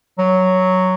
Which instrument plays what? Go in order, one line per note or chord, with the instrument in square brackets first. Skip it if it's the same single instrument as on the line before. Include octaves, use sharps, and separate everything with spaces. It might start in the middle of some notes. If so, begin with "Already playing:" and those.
[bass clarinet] F#3